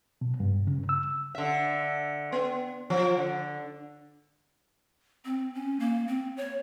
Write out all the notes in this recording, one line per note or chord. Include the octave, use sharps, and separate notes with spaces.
B2
G2
C#3
E6
D3 E5
B3
F3
D3
C4
C#4
A#3
C4
C#5